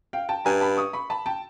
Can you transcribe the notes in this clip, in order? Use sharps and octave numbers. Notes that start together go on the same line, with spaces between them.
F5 G5
G5 A5
G2 G#5 A#5
A5 B5
C#6 D#6
B5 C#6
A5 B5
G5 A5